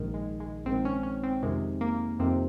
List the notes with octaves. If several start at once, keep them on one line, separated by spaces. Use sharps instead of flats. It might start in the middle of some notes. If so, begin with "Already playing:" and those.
Already playing: A#1 G#2 D#3
G#3
G#3
A#1 G#2 D#3 C4
C#4
C#4
C4
F2 C3 D#3 G#3
A#3
F2 C3 D#3 C4